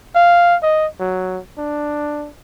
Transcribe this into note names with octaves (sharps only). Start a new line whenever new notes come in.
F5
D#5
F#3
D4